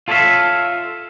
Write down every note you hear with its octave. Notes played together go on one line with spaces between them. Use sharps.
F4 A4 C#5 D5 E5 F5